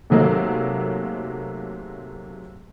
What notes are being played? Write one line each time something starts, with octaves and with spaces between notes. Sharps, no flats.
G#2 C3 F#3 A3 A#3